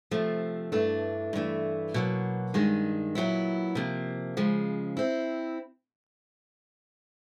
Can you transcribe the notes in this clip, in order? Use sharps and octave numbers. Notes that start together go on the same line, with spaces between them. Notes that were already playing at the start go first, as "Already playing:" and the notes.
C3 F3 A3
G2 E3 A3 D4
G2 E3 A3
B2 F#3 A#3
G2 D#3 G#3
A#2 F#3 B3 E4
C3 F3 A#3
C#3 F3 G#3
C4 E4